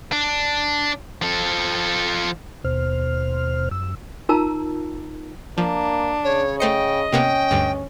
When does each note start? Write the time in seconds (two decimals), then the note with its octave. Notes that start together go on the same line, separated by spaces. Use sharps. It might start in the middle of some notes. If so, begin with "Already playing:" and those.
0.12 D4
1.22 F3 A4
2.64 D#2 B2 C5 F6
3.71 F#2 E6
4.29 D#4 F4 A#4 A5 A#5 E6
5.58 F3 A#3 D4
6.24 C#3 C#5
6.60 A3 C5 D#5 G5 C#7
7.12 C3 A#3 B3 C#4 G5
7.51 D2 G2